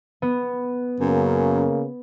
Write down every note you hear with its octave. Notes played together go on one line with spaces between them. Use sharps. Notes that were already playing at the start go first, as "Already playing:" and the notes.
B3
F#2 C#3 A#3